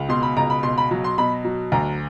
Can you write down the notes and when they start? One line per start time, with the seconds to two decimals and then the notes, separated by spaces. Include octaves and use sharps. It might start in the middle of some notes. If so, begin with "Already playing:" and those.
Already playing: C#2
0.09 B2 C6
0.23 B5
0.37 C#2 A#5
0.50 B5
0.63 B2 C6
0.78 B5
0.91 F#3
1.04 C6
1.18 B2 B5
1.45 F#3
1.72 D2 A#5